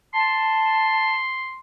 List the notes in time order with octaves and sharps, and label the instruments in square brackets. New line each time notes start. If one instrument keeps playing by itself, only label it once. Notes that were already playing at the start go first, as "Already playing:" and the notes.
[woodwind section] A5 [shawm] C6